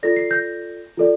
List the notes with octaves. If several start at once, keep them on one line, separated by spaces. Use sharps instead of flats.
F4 A4 D5 A#6
C7
G6 A#6
F4 A4 D5